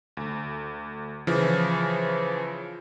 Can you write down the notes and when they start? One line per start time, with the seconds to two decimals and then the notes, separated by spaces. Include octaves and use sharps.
0.17 D2
1.27 C#3 E3 F3